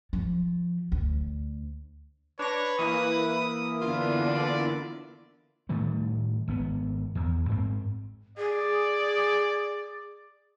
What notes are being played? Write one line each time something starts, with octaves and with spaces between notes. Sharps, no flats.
F3
D2
D4 B4 C#5 A#6
E3 A#3 E4 D#6
D3 B3 D4 F4
D5
A2 D#3 G3 A3
G#1 B3
E2
G#2 C4
G#4 D5